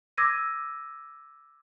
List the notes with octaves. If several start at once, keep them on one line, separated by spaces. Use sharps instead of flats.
D6 E6 G#6 A#6 D#7